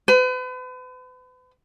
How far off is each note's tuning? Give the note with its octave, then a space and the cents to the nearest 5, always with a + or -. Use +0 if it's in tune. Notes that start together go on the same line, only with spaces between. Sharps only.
B4 +40